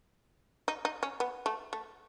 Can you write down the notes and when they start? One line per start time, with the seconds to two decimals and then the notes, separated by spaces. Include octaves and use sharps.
0.68 D#4
0.85 D#4
1.03 C#4
1.20 B3
1.46 A3
1.73 A3